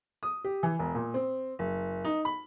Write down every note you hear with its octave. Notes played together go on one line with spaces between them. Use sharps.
D#6
G4
E3
E1
A#2
C4
F#1
D#4
B5